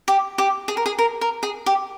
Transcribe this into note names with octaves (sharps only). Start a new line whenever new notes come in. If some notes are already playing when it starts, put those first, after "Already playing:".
G4
G4
G#4
A#4
G#4
A#4
A#4
G#4
G4